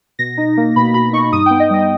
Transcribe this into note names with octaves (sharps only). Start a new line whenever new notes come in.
B2 A#6
D#4
A#3
B2 B5
B2 B5
D#4 C#6
G2 D#6
B3 G5
D#5
G3 D#5